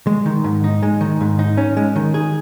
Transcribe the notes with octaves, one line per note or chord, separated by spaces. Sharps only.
G#3
D#3
G#2
D#4
G#3
D#3
G#2
D#4
C#4
G#3
D#3
G#4